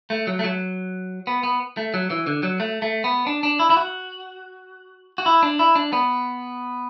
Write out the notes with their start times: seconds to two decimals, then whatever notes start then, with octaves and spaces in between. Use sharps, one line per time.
0.10 A3
0.27 F#3
0.39 A3
0.44 F#3
1.27 B3
1.43 B3
1.77 A3
1.94 F#3
2.10 E3
2.27 D3
2.43 F#3
2.60 A3
2.82 A3
3.04 B3
3.27 D4
3.43 D4
3.59 E4
3.70 E4
3.77 F#4
5.18 F#4
5.26 E4
5.43 D4
5.59 E4
5.75 D4
5.93 B3